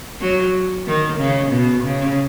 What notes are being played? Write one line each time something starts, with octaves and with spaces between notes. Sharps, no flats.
F#3
D#3
C#3
B2
C#3